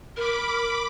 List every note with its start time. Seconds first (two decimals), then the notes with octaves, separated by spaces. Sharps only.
0.17 A#4 B5 D6